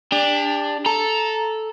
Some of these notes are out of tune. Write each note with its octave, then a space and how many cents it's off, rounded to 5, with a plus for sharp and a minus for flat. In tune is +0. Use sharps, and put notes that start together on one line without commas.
D4 +0 G4 +35
A4 -5 A#5 +0